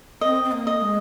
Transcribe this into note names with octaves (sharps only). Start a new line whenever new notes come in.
C4 D#5
C4
A#3
D#5
G#3